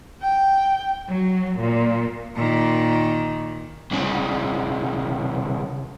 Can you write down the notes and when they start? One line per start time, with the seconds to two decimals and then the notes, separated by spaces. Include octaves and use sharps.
0.23 G5
1.08 F#3
1.59 A#2
2.36 A#2 D#3
3.92 C2 C#3